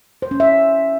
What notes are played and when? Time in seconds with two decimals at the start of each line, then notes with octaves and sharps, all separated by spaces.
0.22 C5
0.31 C#4
0.40 E5